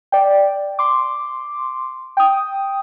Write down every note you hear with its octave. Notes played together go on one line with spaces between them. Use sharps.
D5 G5
C6 D6
G5 D#6